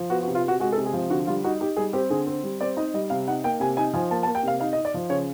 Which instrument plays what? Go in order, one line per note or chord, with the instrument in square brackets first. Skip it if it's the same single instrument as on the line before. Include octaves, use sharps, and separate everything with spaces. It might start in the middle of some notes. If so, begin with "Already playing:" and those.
Already playing: [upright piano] F3
B3 F#4
F#4
C3
F4
C3 F#4
G#3 F#4
A4
C3
G#4
F3
D3 F#4
G3 F4
D#4 F#4
D#4 G4
G3 G#4
C4 G4
D3 G#4
C4
G3
C4 D5
D#4 D#5
G3 D#5
C3 F5
D#4 F#5
A#3 G5
C3 G#5
D#4 G#5
F3 G#5
A#3 A5
A5
A#3
G5
C3 F5
D#4 F5
D#5
D#4
D5
F3
C#3 C#5